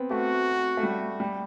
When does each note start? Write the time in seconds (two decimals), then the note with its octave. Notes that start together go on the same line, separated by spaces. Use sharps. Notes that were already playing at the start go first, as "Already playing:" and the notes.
Already playing: B3 C4
0.11 A3 F#4
0.77 A3
0.83 G3
1.20 G3